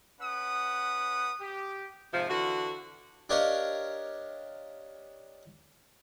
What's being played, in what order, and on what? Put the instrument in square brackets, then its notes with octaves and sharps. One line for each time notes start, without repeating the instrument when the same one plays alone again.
[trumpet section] C#4 B4 F#5 D#6
G4
[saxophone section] G#2 C3 F3
D3 E3 F#4
[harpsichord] D4 G4 A#4 C#5 D#5 F5